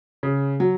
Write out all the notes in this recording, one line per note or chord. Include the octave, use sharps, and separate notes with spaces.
C#3
F#3